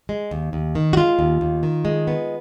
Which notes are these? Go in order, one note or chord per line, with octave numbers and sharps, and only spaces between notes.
G#3
D#2
D#2
D#3
F#4
G#3 F4
D#2
D#2
D#3
G#3
B3